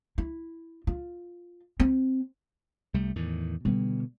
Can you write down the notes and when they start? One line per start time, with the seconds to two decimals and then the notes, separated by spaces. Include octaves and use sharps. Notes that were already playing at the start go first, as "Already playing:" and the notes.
0.18 E4
0.87 F4
1.80 C4
2.94 C2 G3 A3
3.16 E2 A2 D#3
3.65 B2 D3 G3 B3